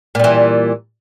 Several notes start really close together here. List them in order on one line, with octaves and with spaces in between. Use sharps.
A#2 G3 E3